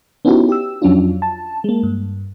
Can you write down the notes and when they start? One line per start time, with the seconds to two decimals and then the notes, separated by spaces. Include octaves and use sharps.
0.25 B3 C#4 D#4 E4 F#4 G4
0.49 G4 E6
0.82 F2 F#3 C#4 D4 F4
1.22 A5
1.64 G#3 A#3
1.83 G2